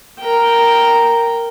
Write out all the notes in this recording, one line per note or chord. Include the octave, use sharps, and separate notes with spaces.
A#4 G5